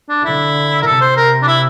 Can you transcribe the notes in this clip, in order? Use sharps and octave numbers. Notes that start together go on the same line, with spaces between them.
D4
D3 E4
A#4
C3 A4
C5
A#4
D4
E4